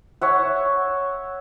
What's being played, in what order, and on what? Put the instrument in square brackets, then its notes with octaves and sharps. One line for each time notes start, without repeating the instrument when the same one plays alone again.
[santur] C#5 E5 F#5